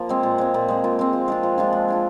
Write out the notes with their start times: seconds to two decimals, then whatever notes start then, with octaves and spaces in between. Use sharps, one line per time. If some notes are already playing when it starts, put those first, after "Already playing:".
Already playing: F3 A#3
0.09 G#3 C4
0.23 A#2
0.38 G#3 C4
0.54 A#2
0.68 G#3 C4
0.84 A#2
0.99 G#3 C4
1.13 F3
1.28 G#3 D4 F4
1.43 F3
1.58 G#3 D4 F4
1.73 F3
1.88 G#3 D4 F4